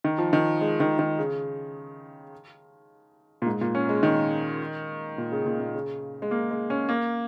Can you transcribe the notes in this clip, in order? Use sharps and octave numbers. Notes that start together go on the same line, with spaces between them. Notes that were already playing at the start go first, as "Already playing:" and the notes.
D#3
F3
D#3
G#3
D#3
D#3
C#3
A#2
G#2
A#2
C#4
G#3
D#3
A#2
C#3
A#2
A#2
C#3
G#3
A#3
G#3
C#4
A#3